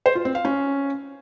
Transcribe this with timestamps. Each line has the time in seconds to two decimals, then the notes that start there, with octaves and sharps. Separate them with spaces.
0.06 C5
0.15 F4
0.25 C4
0.35 F5
0.45 C#4